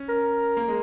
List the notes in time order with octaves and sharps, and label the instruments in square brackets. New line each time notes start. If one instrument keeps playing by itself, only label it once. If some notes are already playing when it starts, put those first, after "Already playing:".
Already playing: [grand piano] C#4
[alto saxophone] A#4
[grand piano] A#3
G#3